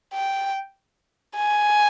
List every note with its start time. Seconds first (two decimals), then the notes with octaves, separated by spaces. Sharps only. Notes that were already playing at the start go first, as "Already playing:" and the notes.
0.14 G5
1.36 G#5